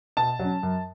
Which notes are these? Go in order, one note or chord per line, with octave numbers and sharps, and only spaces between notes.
B2 A5
F#3 C#4
F#2